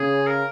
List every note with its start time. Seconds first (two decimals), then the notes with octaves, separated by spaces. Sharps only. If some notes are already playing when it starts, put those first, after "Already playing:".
Already playing: C#3 G#4
0.27 A#4